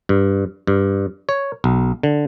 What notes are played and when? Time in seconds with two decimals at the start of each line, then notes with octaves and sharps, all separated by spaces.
0.09 G2
0.67 G2
1.29 C#5
1.64 B1
2.03 D3